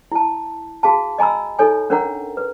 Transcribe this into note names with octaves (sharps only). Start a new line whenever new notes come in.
E4 A5
F#4 G#4 F5 A5
D#5 G#5 A#5 B5 E6
D#4 A4 C#5 G#5
C#4 D4 A#4 C#5 F#5 A#5
B4